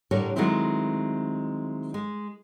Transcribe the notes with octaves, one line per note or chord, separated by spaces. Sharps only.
A2 D3 G3 A#4 C#5
D#3 F#3 G#3 A3 C4 E4
G#3